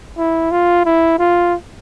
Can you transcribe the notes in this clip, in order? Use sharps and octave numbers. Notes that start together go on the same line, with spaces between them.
E4
F4
E4
F4